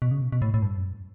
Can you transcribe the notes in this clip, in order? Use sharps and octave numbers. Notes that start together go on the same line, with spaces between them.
B2
C#3
B2
B2
A2
A2
G2
F#2